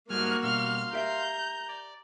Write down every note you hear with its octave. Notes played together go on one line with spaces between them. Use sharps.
G#2 G3 A3 A#3 F#4 G#5 F6 F#6
B2 G3 C#4 F5 C6 F6
G4 A#4 E5 A#5 G6
D5